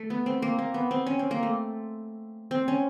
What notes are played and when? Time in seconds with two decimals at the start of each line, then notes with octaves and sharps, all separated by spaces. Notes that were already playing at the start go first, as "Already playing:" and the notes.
Already playing: A3
0.10 B3
0.26 C4
0.42 A#3
0.59 A#3
0.74 B3
0.91 C4
1.06 C#4
1.19 C4
1.31 A#3
1.43 A3
2.51 C4
2.68 C#4